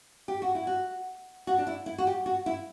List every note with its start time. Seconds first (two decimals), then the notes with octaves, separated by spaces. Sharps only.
0.28 G4
0.42 F#4
0.55 E4
0.67 F#4
1.47 F#4
1.58 D4
1.67 E4
1.86 E4
1.98 F#4
2.07 G4
2.26 F#4
2.46 E4